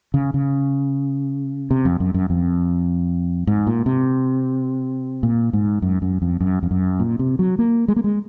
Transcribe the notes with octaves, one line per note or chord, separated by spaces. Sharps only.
C#3
C#3
C3
F2
F#2
F#2
F2
G#2
A#2
C3
A#2
G#2
F#2
F#2
F2
F#2
F2
F#2
A#2
C3
F#3
A#3
G#3
A#3
G#3